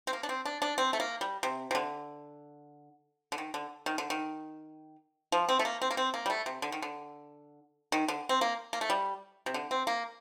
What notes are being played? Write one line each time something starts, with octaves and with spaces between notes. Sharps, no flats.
C4
A#3
D4
C4
D4
D4
C4
A3
A#3
G3
C3
C3
D3
D3
D#3
D3
D#3
D3
D#3
F3
C4
A3
A#3
C4
A#3
C4
A#3
G3
A3
C3
D3
D#3
D3
D#3
D3
C4
A#3
A#3
A3
G3
C3
D3
C4
A#3